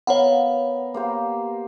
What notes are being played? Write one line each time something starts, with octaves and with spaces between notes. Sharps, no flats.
B3 A#4 C#5 F5 F#5
A#3 G4 C5